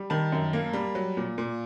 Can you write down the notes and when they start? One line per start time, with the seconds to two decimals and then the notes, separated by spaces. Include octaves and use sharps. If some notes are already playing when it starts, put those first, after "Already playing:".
Already playing: G3
0.10 D#3 A5 B5
0.32 F#2
0.53 A#3
0.73 G3
0.95 F#3
1.17 A#2
1.38 A#2